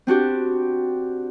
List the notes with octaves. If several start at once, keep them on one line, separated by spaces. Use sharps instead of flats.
C4 D4 F#4 G4